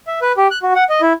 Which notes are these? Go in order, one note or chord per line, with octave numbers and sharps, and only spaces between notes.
E5
B4
G4
F#6
F#4
F#5
D#5
E4